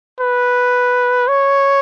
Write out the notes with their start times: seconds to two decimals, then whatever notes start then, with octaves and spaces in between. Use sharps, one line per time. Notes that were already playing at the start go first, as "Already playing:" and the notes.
0.21 B4
1.28 C#5